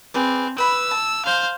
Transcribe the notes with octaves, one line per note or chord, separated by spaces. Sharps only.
C4 G#4 B4 D5
B4 B5 E6
A5
C5 F5